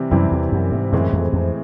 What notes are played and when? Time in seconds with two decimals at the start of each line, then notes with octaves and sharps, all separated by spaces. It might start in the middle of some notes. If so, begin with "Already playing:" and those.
Already playing: C3 E3 G3 C4
0.11 F#2 C3 E3 G3 C4 E4
0.32 E2
0.52 F#2
0.72 G#2
0.92 F#2 A2 E3 G#3 C4
1.13 F2
1.33 F2